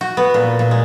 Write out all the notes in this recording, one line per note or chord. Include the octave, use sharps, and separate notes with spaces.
F#4
B3
A#2
A#2
G#3